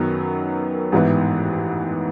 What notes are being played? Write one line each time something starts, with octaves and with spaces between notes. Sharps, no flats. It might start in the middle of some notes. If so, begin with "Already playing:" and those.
Already playing: F#2 D#3 F#3 B3
A1 G#2 E3 B3 E4